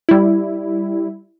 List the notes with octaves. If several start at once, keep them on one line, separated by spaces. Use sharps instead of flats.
G3 E4